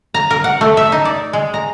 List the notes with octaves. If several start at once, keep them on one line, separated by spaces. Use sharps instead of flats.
A#5
A#4
F#5
A3
E5
D#4
D5
G#3
A#5